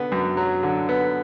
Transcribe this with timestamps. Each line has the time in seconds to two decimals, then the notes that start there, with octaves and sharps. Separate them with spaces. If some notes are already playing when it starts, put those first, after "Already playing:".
Already playing: D3 B3
0.12 F#2
0.37 F#3
0.63 D3
0.89 B3